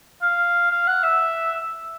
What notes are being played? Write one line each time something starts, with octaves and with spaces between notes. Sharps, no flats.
F5
F5
F#5
E5